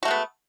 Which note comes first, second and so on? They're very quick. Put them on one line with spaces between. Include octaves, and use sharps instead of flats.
F#4 A3 G#3 B3